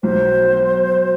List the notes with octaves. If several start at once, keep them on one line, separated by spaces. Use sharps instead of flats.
B1 B2 F#3 C5